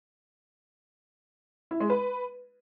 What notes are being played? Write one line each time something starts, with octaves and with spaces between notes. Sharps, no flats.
E4
G#3
B4